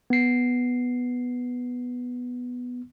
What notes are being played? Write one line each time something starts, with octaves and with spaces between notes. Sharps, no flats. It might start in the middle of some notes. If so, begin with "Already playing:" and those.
B3 C7